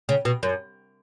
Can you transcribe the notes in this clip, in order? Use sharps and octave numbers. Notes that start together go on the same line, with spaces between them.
C#3
B2
F#2